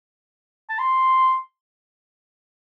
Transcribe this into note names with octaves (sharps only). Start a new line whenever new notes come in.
A5
C6